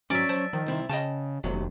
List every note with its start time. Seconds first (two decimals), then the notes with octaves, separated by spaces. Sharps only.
0.10 G#2 F#3 C#4 D5 E5
0.29 F#3 C5 A5
0.53 D#3 F3
0.66 C2 C4 E4
0.89 C#3 D#5 G5 A5
1.44 F1 D#2 C3 F#3